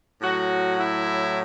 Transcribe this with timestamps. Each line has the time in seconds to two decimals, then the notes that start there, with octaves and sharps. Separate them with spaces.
0.21 A2 F#3 F#4
0.78 E4